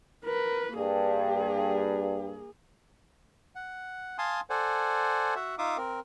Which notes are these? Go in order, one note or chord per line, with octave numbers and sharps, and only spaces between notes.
A#4 B4
G2 A#3 G#4
F#5
F5 G#5 A5 C6 D#6
A4 C5 D5 F#5 G#5
F#4 E5 F#5
D#4 F4 E5 F5 D6 D#6
C4 A#4